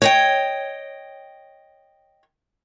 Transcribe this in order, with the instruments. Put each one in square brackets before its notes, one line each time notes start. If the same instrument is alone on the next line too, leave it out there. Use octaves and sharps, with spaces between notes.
[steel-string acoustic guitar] C#5 D#5 G5